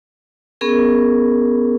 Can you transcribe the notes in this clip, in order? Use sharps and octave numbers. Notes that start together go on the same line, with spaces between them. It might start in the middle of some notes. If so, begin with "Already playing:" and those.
B3 C#4 G#4 A#4